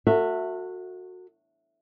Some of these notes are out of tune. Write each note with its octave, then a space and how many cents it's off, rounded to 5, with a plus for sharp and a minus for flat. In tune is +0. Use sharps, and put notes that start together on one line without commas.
F#4 -15 A4 +40 E5 +0